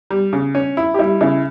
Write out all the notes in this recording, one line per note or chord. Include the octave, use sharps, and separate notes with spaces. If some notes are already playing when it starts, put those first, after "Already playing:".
G3
C#3
C#4
E4
G4
G3 E4
C#3 E4